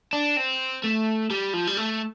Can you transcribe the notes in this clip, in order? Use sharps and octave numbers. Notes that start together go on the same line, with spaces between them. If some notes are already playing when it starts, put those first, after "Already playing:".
D4
C4
A3
G3
F3
G3
A3